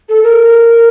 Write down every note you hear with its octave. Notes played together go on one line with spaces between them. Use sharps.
A4
A#4